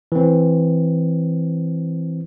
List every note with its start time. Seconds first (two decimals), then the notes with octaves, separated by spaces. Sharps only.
0.12 E3 C4